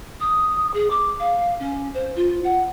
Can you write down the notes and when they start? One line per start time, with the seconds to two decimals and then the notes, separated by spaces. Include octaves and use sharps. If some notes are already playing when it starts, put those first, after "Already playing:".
0.20 D#6
0.74 G#4
0.90 D6
1.19 F5
1.60 C#4
1.94 C5
2.16 F4
2.44 F#5